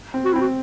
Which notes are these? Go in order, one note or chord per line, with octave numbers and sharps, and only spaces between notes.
C4
F#4
E4
C4
F#4